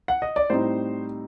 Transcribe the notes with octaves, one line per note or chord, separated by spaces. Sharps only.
F#5
D#5
D5
A2 G3 C4 D#4 C5